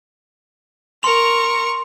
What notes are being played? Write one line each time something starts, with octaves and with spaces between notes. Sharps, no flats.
A#4 C6 C#6 F7